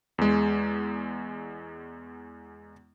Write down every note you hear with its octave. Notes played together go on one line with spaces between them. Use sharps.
E2 G#3